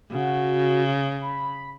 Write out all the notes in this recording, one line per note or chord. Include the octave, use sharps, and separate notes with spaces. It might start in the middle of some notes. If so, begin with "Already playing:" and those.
C#3 F#4
B5